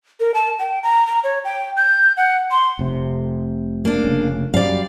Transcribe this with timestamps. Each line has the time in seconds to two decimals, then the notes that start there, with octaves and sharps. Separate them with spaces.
0.20 A#4
0.34 A5
0.59 G5
0.83 A#5
1.07 A#5
1.24 C#5
1.45 G5
1.77 G6
2.17 F#5
2.51 C6
2.79 F1 C3
3.85 A#3 D4
4.04 F1 C#3
4.54 F#2 G3 D5 F5